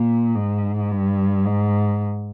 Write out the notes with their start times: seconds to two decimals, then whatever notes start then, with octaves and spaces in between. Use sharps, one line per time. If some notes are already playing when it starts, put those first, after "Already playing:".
Already playing: A#2
0.35 G#2
0.91 G2
1.46 G#2